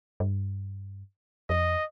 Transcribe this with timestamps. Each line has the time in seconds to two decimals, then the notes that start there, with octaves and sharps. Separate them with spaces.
0.20 G2
1.50 F2 D#5